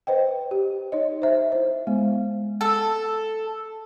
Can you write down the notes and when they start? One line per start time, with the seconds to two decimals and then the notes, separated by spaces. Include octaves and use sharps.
0.07 B4 C5 D#5 G5
0.51 G4
0.92 D#4 C#5 D#5
1.22 C5 E5
1.52 E4 C5
1.87 G#3 B3
2.61 A4